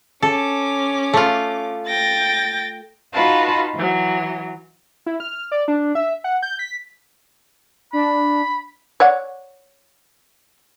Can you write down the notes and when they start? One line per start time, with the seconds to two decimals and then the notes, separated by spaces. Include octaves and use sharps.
0.22 C#4 A4 D6
1.13 A3 F4
1.88 G5 A6 A#6
3.13 D#4 F4 F#4 B4 F5 A5
3.75 E3 F#3
5.06 E4
5.20 F6
5.52 D5
5.68 D4
5.95 E5
6.24 F#5
6.43 G6
6.59 B6
7.93 D4 B5
9.00 C#5 D5 F#5